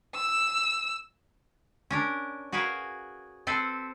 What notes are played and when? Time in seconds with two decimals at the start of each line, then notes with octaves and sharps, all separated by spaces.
0.14 E6
1.91 C#4 D4 A#4
2.52 F#4 G#4 A#4 B4 C#5 F5
3.47 C4 A4 B4 C5